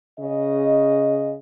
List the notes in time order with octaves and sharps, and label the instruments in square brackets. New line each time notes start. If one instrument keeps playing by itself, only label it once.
[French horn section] C#3 D#5